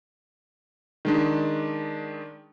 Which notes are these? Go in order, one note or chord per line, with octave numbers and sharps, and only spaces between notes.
D#3 G#3 D4